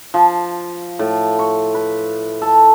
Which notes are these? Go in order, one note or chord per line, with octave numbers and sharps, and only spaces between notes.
F3
A2
C#6
B4
A4